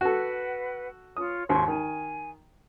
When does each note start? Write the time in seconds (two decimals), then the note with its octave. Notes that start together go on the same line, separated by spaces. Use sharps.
0.01 F#4 A4 B4 F#5
1.17 F4 C#5 D#6
1.49 G#1 D#2 C6 C#6
1.68 D#3 G#5